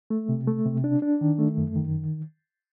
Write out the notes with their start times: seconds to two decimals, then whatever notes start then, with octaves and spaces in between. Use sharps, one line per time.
0.10 A3
0.29 C3
0.47 A3
0.65 C3
0.84 D4
1.02 D4
1.21 D#3
1.39 A3
1.57 F#2
1.76 D#3